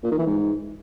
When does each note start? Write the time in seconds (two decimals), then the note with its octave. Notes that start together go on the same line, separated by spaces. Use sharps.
0.04 A#2
0.11 D#3
0.19 E3
0.26 G#2